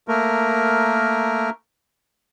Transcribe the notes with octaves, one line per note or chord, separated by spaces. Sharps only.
A3 A#3 A#4